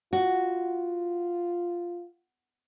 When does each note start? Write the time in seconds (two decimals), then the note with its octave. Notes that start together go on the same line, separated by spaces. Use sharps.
0.13 F4 F#4